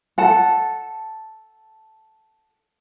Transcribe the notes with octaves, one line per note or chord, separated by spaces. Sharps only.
A4 F#5 A5